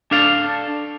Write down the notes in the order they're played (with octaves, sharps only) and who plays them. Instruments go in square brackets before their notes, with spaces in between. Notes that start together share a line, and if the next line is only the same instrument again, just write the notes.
[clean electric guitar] D4 A4 F5